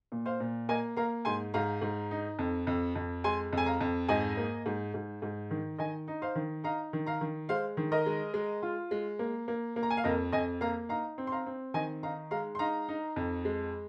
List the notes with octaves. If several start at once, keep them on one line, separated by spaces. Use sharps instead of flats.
A#2
C5 F5
A#2
A#3 D#5 G#5
A#3 F5 A#5
G#2 G#5 C6
G#2 F5 A#5
G#2
D#4
F2
F2
F2
G#3 G#5 C6
F2
G#5
F5 A#5
F2
G#2 D#5 G#5
A#3
G#2
G#2
G#2
D#3
D#3 D#5 G#5
D#4
C5 F5
D#3
D#4 F5 A#5
D#3
F5 A#5
D#3
G#3 C5 F5
D#3
A#4 D#5
G#3
G#3
F4
G#3
A#3
A#3
A#3
A#5
G#5
F5
F2 A#4 D#5
F2 D#5 G#5
A#3 F5 A#5
D#4 F5 A#5
C4
C6
F5 A#5
C4
D#3 D#5 G#5
D#4 F5 A#5
G#3 F5 A#5
C6
D#4 F5 A#5
D#4
F2
G#3